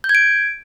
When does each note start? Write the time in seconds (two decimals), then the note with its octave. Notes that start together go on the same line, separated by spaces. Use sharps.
0.04 G6
0.09 G#6
0.15 D7